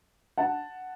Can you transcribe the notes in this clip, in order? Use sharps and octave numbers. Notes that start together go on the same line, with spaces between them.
F#5 A5